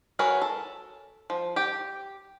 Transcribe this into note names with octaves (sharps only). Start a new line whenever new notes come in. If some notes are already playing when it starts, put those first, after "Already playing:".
F#4 G#4 A#4 B4 C#5
A4
F3
G4 G5